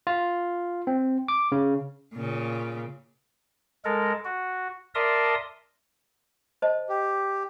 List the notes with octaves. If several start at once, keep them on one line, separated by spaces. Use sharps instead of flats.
F4
C4
D6
C#3
A#2 C#3
G#3 A4 A#4
F#4
A#4 D5 E5 A5 C6 D#6
C5 D#5 A5
G4